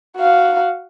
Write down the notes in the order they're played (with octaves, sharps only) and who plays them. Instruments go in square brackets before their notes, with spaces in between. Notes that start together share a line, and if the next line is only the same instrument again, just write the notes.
[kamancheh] F#4 F5